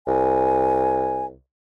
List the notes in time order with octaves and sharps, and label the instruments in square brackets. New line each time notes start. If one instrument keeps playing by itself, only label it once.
[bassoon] C2 [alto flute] G#5